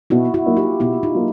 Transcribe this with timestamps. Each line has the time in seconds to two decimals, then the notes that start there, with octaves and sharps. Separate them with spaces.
0.10 B2 E4 F#4
0.34 E4 F#4
0.46 F#3 A#3 D#4
0.56 F4 G4
0.80 B2 E4 F#4
1.03 D#4 F4
1.15 F#3 A#3